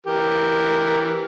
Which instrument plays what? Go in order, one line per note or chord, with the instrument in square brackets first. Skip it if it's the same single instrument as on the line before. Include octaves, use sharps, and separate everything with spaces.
[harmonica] E3 G4 A#4